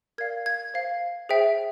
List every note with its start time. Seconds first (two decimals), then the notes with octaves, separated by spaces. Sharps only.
0.18 A#4 D5 F5 G#6
0.46 G#6
0.74 C5 F5
1.29 G#4 C5 E5 G5